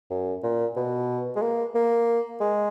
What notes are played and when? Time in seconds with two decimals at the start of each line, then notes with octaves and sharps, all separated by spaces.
0.10 F#2
0.43 A#2
0.76 B2
1.36 G#3
1.42 A#3
1.75 A#3
2.40 G#3